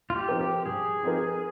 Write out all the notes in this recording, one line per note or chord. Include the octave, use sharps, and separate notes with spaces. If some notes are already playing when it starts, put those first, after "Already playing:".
F4
G4
F3 C4 D#4 A#4
G4
G2 G#4
F3 C4 D#4 A#4